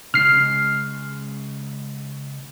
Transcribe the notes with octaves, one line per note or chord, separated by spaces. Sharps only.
C#3 G#3 F6 C7